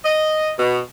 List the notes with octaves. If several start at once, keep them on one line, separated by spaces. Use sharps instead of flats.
D#5
B2